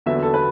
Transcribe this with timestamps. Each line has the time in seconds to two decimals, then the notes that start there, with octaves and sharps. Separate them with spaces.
0.06 E2 D3 F#3 B3 E5
0.23 A4
0.34 B4